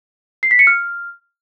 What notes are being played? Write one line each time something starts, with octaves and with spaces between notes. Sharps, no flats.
C7
B6
C#7
F6